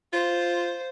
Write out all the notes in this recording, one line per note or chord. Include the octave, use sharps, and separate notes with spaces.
F4 C5